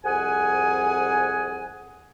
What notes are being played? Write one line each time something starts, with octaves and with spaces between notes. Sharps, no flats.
C2 F2 G#4 F#5 G#5